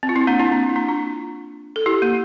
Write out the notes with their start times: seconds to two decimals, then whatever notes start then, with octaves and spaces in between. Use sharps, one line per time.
0.03 C4
0.09 F4
0.16 C4 E4
0.27 A#3 D4
0.39 C4 E4
0.51 A#3 D4
0.69 E4
0.76 A#3 D4
0.88 D4 F4
1.76 A4
1.86 E4 G4
2.02 A#3